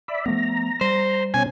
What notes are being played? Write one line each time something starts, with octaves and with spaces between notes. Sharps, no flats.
D5 E5 B5
F3 A3 B3 A#5
G3 C5
B2 C#4 G#5